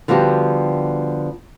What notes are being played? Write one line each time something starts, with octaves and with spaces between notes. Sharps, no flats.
D3 F3 G3 B3 F#4 G4